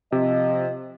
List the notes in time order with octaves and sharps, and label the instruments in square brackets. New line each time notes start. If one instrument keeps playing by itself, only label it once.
[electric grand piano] C3 [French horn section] F3 D#5